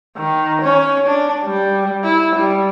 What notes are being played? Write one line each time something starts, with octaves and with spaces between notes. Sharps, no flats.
D#3
C#4
D4
G3
E4
G3